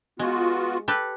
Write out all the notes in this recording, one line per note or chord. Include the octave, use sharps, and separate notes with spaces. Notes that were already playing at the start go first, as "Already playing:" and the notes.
G#3 B3 F4 F#4
G4 A4 B4